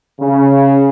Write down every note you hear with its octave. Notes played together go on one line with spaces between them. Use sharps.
C#3